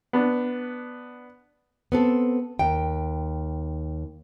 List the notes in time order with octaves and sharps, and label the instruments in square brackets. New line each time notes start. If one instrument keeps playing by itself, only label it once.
[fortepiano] B3 D4
[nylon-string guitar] B3 C4 A4
D#2 G5